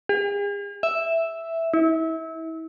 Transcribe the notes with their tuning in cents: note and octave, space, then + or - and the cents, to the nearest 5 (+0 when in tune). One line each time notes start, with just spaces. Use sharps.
G#4 -45
E5 +0
E4 -30